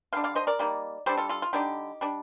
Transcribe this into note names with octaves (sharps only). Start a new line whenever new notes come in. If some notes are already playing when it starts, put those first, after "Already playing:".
D3 G3 D4 F5
D5 F5
C5 D#5
A#4 D5
G3 A#3 D#4
G3 D4 A4 C5
F4 A4
F4 A4
F4
D3 G3 D4 D#4 G4
G3 D4